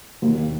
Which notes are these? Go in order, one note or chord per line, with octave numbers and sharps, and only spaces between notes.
D#2